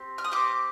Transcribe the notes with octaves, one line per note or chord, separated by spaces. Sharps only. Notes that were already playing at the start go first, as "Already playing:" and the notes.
Already playing: C4 G4
F6
D#6
C4 G4 D6